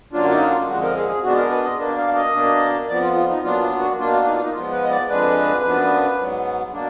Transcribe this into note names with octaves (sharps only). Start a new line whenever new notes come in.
F#2 D3 F#3 A#3 D4 F4
D#4
F4
F2 D3 F3 G#3 F#4
A#4
G#4
G#4
B2 G#3 B3 D4 F#4
A#4
B4
D#5
B2 A#3 D4
F5
D#5
B2 A#3 D4
F2 F3 B3 D5
F4
F4
D#4
A#2 F#3 B3 D4 F4
F4
F#4
B2 A#3 D4 F4
D#4
F4
D#4
G#2 F3 B3 F4
B4
D#5
D5
F2 D3 G#3 D4 B4
F#2 F3 B3 D4
G#2 F#3 B3
B2 A#3 D4